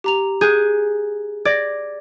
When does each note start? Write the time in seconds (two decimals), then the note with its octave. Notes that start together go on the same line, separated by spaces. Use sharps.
0.04 G4 A#5 F7
0.41 G#4 F#6 G6
1.45 D5 G#6 A#6